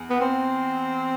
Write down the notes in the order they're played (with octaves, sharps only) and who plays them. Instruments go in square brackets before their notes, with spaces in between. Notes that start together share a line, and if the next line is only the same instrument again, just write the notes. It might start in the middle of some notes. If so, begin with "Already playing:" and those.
Already playing: [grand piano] E2
[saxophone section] B3
C4